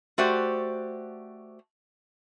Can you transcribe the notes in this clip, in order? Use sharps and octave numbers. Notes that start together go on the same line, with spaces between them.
A3 F#4 G4 C5 D5